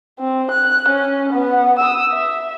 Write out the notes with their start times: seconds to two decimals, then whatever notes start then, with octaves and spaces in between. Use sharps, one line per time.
0.19 C4
0.51 F#6
0.88 C#4
1.32 B3 F#5
1.79 D#6 E6
2.13 E5